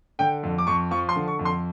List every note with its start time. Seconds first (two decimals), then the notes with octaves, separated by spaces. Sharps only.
0.19 D3 G5
0.43 F2
0.58 D6
0.67 F2 C#6
0.91 F3 C#6
1.09 C6
1.16 D3
1.28 C#6
1.39 F2
1.45 C6